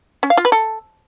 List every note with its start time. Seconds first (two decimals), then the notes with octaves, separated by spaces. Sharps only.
0.23 C#4
0.30 F5
0.37 F4
0.45 B4
0.52 A4